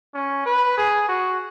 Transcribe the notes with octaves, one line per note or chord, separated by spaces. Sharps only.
C#4
B4
G#4
F#4